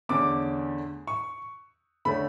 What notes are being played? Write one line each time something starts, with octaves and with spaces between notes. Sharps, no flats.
E2 D3 A3 C#4 D6
C#6
D3 A3 C#4 B5